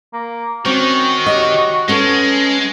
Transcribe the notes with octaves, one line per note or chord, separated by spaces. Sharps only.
A#3
D#3 C4 C#4 F#4
G4 C#5 D#5
G#3 B3 C#4 A4